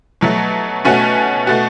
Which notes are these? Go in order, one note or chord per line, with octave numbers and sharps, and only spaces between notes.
B2 F#3 A3
B2 A3 C#4 F#4
B2 A3 F#4